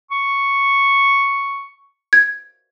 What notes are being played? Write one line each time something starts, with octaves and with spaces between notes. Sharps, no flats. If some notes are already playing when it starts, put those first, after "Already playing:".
C#6
G#6